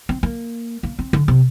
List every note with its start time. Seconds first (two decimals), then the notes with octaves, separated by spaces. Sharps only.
0.09 C4
0.23 A#3
0.83 A#3
0.99 C4
1.13 D3
1.28 C3